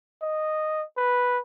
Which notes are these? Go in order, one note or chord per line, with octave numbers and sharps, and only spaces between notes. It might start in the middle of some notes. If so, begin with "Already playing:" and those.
D#5
B4